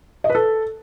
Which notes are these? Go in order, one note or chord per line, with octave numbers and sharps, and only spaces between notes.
D#5
B4
A4